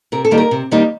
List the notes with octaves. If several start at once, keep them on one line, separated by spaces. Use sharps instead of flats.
C3 A#4
A4
D#3 G3 A#3 D#4
A#4
C3
D#3 G3 A#3 D#4